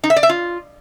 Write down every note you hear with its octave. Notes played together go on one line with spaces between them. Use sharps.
D#4
E5
D5
E5
F4